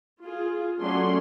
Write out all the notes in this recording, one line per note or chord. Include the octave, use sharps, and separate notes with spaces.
F4 G#4
F#3 A3 C#4 D5 C6